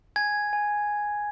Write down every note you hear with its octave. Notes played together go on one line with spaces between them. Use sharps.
G#5 G#6
G#5